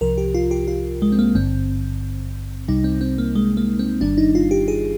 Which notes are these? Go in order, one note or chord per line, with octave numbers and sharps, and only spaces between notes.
C2 C3 F3 A#4
G4
F4
G4
F4
G#3
C4
A#3
G#1 G2 D3 C4
C2 C3 G3 D#4
C4
C4
A#3
G#3
A#3
C4
G1 G2 D#3 G3 D4
D#4
F4
G4
G#4